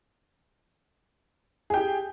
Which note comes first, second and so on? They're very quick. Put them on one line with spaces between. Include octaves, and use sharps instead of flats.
G#4 G5 G4